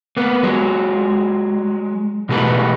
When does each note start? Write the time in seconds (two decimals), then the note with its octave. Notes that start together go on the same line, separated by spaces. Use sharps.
0.17 A#3 B3
0.43 F#3 G#3
2.29 B2 E3 G#3 A3 G4 B4